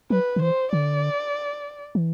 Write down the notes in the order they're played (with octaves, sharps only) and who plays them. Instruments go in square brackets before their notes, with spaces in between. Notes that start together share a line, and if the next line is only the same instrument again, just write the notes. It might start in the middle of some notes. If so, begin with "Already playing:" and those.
[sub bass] F#3 [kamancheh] B4
[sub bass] D3
[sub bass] E3 [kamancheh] C5
[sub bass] D3 [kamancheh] D5
[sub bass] E3